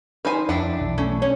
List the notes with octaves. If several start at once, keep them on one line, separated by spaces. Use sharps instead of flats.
D#3 D#4 B4 C5 G#5
F2 D4 E4 F#5 G5
B1 E3
A3 C#4
C#4 C#5